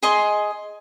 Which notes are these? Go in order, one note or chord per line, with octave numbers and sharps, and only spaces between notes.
G#4 D#5 C6